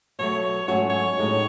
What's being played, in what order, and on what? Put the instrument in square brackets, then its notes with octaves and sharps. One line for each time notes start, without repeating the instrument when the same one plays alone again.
[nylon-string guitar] B2 F#3 A3 [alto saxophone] C#5
[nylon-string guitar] G#2 F#3 A3 C#4 F#4 [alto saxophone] C#5
[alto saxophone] C#5
[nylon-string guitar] A2 G#3 D#4 F#4